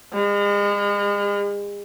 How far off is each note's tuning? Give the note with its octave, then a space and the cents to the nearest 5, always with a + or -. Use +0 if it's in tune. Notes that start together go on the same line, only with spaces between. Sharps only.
G#3 -40